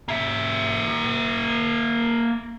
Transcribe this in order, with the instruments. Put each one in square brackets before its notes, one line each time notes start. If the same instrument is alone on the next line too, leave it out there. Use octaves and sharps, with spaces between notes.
[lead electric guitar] A#3 E5